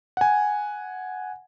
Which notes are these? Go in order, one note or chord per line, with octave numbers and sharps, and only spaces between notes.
F#5 G#5